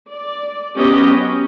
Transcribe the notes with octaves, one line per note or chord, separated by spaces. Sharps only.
D5
F#3 B3 C#4 G4 D#5
C#4